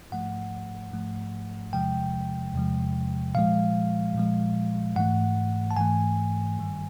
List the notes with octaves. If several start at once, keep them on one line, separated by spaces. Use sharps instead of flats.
G#2 F3 A3 F#5
G#2 F3 A3
E2 C3 F3 G#3 G5
E2 C3 F3 G#3
A#2 F3 G#3 F5
A#2 F3 G#3
G#2 E3 A3 F#5
A5
G#2 E3 A3 G#5
G2 D#3 G3